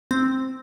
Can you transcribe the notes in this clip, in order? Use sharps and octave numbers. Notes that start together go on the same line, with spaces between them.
C4